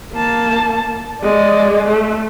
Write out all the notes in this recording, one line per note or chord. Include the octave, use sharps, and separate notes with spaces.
A#3 A5
G#3 D5
A3